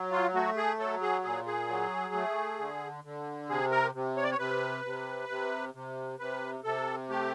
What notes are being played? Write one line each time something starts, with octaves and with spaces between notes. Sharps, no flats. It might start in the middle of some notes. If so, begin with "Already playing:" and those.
Already playing: F#3
F4
A3 F#4
G#4
F#3 A4
G#4
A#2 G#4
G#4
F#3
A3
D3
D3
C3 G#4
A#4
C3
C#5
D5
C#5
C3 B4
C3
C3
C3
C3 B4
C3 A4
A3 G4